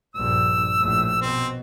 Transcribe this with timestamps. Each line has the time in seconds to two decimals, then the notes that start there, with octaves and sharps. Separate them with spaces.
0.16 A#1 G2 E6
0.80 A#1 A2
1.22 B2 C4